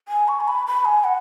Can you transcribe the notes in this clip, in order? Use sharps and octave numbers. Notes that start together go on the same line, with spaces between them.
G#5
C#6
G#5
B5
B5
G#5
F#5